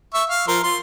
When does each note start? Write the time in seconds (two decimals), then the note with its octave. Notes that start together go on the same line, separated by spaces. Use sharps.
0.14 E5 C#6
0.29 F5
0.48 F3 A#4 C6
0.63 F4 C6